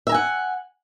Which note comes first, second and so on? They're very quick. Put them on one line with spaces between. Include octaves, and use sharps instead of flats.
E5 A#5 G#5 F#5